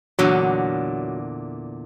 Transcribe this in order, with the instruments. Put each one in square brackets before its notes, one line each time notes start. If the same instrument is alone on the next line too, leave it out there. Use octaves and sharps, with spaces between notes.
[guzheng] E2 A#2 D3 [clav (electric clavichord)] F#3